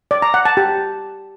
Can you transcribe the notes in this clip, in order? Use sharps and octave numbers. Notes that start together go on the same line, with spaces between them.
D5
A#5
F#5
A5
G4